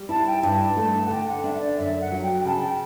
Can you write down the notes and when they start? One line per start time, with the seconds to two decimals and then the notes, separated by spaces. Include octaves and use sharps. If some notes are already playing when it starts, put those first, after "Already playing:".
Already playing: G3
0.09 E4 A5
0.27 G5
0.43 G2 A5
0.77 A3
1.05 F#5
1.10 D3 G5
1.28 F#5
1.44 D4 E5
1.55 E5
1.61 D5
1.78 F#2 E5
2.01 F#5
2.12 F#3
2.22 G5
2.40 G5
2.45 C#3 A5
2.63 G5